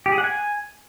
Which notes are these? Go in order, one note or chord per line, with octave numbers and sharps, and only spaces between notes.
G4
G#4
F#5
G#5